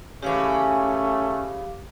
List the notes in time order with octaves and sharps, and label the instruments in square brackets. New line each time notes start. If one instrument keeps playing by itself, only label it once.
[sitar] C#3 E3 [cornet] A3 [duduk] C#4 [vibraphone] G4 F5 D6